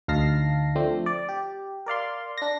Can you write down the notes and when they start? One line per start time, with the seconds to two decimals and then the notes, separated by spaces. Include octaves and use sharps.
0.08 D2 D#4 F5 A5 A#6 C7
0.76 F3 A3 C4 D4
1.06 D5
1.29 G4
1.86 A#4 D5 F5 C6
2.38 D4 A#6